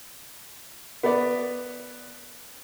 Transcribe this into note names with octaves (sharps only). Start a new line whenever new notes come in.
B3 B4 D5